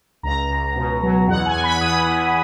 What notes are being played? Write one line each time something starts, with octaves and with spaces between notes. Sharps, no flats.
C#2 A#5
C#2
B2
F#3
E2 F#5
G#5
E2
B5
E2 D#6
E2